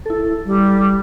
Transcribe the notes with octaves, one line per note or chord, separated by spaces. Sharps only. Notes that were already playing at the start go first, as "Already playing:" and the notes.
E4 A4
G3